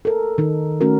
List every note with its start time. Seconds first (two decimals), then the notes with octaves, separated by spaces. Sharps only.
0.05 A4 A#4
0.38 D#3 D#4
0.81 A3 C#4 F#4 A#4